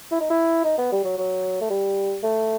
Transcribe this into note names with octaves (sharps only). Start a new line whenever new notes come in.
E4
D#4
E4
D#4
B3
G3
F#3
F#3
A3
G3
A3